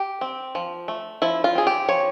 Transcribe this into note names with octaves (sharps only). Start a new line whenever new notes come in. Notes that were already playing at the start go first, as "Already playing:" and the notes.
Already playing: G4
C4
F3
A3
F3 E4
F4
C4 G#4
G4
F3 C#5